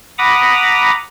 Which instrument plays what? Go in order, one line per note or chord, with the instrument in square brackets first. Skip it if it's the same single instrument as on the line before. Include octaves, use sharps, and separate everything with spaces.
[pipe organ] F#5 A#5 B5 D6 D#6